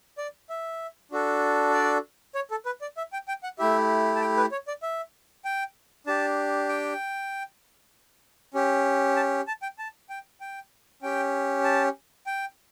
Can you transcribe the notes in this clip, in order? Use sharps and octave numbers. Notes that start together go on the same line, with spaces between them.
D5
E5
D4 F#4 A4
D5
C#5
A4
B4
D5
E5
G5
G5
F#5
A3 E4 G4 E5
A5
G5
B4
C#5
D5
E5
G5
D4 G4 A5
G5
C#4 G4
A5
A5
G5
A5
G5
G5
C#4 G4 G5
A5
G5